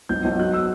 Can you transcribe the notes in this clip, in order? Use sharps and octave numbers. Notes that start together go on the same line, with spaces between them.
B1 G6
B1
F#3 F#6
E6